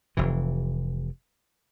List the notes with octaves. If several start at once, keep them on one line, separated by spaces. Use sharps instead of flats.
F1 C3 E3